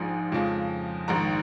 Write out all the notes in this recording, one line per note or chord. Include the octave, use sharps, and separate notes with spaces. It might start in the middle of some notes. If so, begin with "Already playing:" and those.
Already playing: A#1 G#2 F3 G#3 G#5
F2 C#3 F3 G#3
A#1 G#2 D#3 A#5